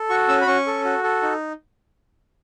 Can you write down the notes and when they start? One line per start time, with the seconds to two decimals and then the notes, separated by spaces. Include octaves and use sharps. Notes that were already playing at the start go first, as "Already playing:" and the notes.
Already playing: A4
0.10 F#4 C#6
0.28 C#4 E6
0.41 B5
0.47 C#4 C#6
0.67 A4
0.85 F#4
1.04 A4
1.22 D#4